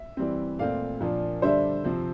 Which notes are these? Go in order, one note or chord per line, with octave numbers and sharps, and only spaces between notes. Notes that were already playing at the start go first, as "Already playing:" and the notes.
Already playing: E5
E3 G3 C4
A#2 A3 C4 D5 F5
A#2 F3 A#3 D4
D3 G3 D4 C5 E5
C3 F3 C4